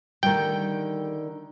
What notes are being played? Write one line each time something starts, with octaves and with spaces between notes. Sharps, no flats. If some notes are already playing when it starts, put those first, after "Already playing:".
D3 D#3 G3 A3 G5